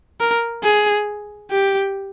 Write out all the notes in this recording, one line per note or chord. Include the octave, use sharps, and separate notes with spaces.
A#4
G#4
G4